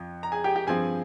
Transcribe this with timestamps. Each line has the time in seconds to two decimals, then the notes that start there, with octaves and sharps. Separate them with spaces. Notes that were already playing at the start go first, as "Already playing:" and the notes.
Already playing: F2 F3
0.23 A#5
0.32 G#4 G#5
0.44 G4 G5
0.56 G4 G5
0.67 G2 F3 C4 G#4 G#5